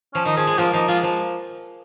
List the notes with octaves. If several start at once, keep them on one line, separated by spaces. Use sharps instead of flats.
F3 C#4
D#3 D#4
F3 G#4
G#3 G#4
F3 A#3 F4
F3 A#3 D#4
G#3 F4
F3